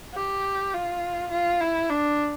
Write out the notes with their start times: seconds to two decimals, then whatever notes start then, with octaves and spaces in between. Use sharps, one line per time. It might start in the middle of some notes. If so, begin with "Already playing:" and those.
0.14 G4
0.73 F4
1.31 F4
1.61 E4
1.90 D4